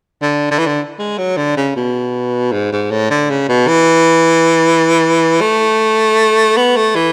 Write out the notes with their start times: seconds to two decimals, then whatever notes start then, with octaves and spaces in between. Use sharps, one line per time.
0.22 D3
0.51 D3
0.58 E3
0.66 D3
0.99 G#3
1.18 F#3
1.37 D3
1.57 C#3
1.76 B2
2.52 G#2
2.72 G#2
2.91 A2
3.11 D3
3.30 C#3
3.49 B2
3.68 E3
5.41 A3
6.57 B3
6.76 A3
6.96 E3